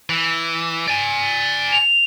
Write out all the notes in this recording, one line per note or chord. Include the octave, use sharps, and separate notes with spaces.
E3
D5 G#5
F7